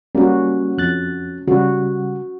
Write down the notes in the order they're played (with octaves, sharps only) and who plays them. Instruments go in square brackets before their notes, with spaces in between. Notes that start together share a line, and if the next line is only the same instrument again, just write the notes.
[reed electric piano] G3 A#3 [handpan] C#4 F#4
[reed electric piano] F2 F#6 A6
[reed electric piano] C#3 G3 [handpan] F#4